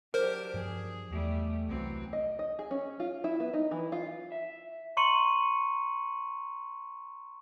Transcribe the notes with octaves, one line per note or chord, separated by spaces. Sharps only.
F#3 D4 G4 A#4 C5
G2 F3 G#4
E2 G3 A3
C2 E3 F#3 C4
D#5
D#5
G#4
C#4
F4
E4
B3
D#4
E3
F4
E5
A#5 C6 C#6 C#7 D#7 F#7